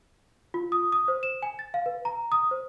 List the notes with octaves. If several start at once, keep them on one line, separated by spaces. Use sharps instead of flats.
F4
D#6
D#6
C5
E7
G#5
A6
F5
B4
A#5
D#6
C5